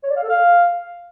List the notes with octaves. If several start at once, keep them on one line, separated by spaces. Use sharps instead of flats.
C#5
D5
F5
A4
F5